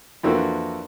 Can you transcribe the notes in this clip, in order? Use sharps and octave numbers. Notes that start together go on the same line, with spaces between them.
F2 E3 A#3 D4 F#4 A4